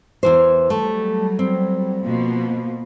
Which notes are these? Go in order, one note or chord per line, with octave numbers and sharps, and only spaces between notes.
E2 E3 C5
F#3 G3 A3
C4
B2 F3 A#3